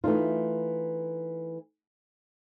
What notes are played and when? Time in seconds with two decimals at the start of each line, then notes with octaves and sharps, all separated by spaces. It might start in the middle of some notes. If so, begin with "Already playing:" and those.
0.04 E3 A3 D#4 F4